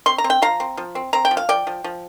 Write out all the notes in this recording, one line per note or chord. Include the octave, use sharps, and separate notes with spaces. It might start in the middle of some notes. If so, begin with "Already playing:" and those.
C4 C6
A#5
C4
G5
F3 F5 A#5
C4
F3
C4
C4 A#5
G5
F3
F5
F3 D5 G5
F3
F3